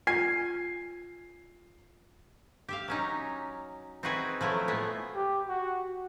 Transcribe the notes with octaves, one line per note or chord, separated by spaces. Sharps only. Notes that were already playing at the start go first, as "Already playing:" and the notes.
F4 G#5 C7
G4 E5 F5
F#3 C#4 D#4
C4 D#4 E4 F#4 G#4 B4
F3 F#3 A3 E4
A2 G#3 A3 B3
G4
F#4